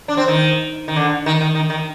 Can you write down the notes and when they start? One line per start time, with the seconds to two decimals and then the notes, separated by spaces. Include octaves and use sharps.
0.08 D4
0.17 C4
0.28 D#3
0.88 D#3
0.96 D3
1.26 D#3
1.41 D#3
1.55 D#3
1.70 D#3